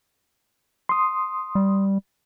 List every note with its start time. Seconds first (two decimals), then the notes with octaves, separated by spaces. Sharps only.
0.89 C6 D#6
1.55 G3